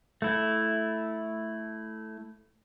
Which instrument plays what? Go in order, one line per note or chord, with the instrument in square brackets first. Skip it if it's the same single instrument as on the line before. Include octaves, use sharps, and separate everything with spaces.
[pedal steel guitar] A3 E4